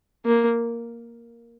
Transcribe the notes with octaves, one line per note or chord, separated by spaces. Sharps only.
A#3